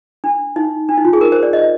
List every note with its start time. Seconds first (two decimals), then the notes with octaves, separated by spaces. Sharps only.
0.24 D4
0.56 D#4
0.89 D4
0.97 D#4
1.05 F4
1.13 G#4
1.21 A#4
1.32 C5
1.43 D5
1.53 D#5